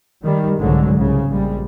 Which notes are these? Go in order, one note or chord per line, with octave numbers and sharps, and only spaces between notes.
D#3 G3
C2 G#2 D3 F#3 G#3
C2 C#3
A#1 G3 G#3